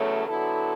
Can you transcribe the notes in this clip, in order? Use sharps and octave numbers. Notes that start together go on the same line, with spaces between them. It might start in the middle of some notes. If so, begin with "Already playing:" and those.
Already playing: E2 C#3 F#3 A3
D3 F#3 B3 E4 A4